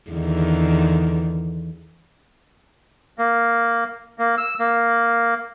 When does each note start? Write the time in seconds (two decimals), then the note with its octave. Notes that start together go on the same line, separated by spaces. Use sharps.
0.11 E2 D3 D#3
3.18 A#3
4.19 A#3
4.38 E6
4.60 A#3